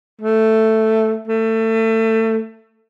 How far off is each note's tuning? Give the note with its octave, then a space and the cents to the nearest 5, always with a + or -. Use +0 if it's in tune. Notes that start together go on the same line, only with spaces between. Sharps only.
A3 +5
A3 +25